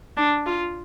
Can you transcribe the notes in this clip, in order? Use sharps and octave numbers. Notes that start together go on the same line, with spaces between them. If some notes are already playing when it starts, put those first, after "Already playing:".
D4
F4